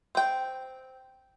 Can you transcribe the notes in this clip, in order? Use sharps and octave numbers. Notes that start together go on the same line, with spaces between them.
C4 G5